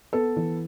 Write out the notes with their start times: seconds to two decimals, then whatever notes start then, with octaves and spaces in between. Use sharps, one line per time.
0.13 B3 A4
0.36 E3